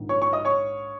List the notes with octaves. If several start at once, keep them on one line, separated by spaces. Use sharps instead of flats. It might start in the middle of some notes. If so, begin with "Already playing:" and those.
Already playing: A#1 G#2 D#3
C#5 C#6
C#5 C#6
D#5 D#6
C#5 C#6